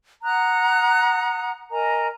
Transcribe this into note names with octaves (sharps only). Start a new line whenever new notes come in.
F#5 A#5 D#6 F#6
A#4 D#5 G#5 A#5